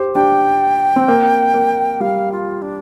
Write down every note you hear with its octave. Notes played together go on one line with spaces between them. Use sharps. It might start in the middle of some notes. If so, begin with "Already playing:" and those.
Already playing: G4 C5
D4 G4 G5
C4
A#3
A#3
G3 F5
F4
D4